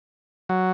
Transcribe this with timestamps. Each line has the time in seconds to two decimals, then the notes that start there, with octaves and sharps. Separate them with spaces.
0.49 F#3